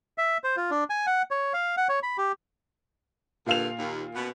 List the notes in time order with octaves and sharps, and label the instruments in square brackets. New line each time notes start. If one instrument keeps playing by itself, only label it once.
[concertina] E5
C5
F4
D4
G#5
F#5
C#5
F5
F#5
C#5
B5
G4
[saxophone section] G2 D3 [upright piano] A#2 F5 F7
[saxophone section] D#2
F#2 B2 B3